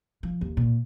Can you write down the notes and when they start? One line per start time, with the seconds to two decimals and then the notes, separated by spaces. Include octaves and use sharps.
0.23 F3
0.41 D#2
0.57 A#2